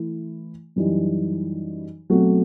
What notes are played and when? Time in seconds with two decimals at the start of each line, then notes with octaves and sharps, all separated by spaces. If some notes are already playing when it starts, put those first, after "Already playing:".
Already playing: E3 A3 E4
0.76 F#2 E3 G3 D#4
2.10 B2 F#3 A3 C4 F#4